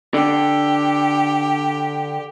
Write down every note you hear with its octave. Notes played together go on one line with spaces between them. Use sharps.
D3 G4